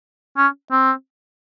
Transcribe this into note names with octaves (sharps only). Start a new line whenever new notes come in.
C#4
C4